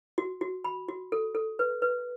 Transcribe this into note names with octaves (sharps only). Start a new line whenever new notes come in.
F#4
F#4
B5
F#4
A4
A4
B4
B4